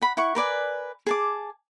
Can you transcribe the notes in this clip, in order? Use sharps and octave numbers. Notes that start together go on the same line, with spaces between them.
F#5 B5
E4 F#5 C#6
A#4 B4 D5 G#5
G#4 A5 D6